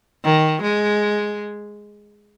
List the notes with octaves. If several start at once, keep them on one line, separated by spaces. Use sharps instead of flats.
D#3
G#3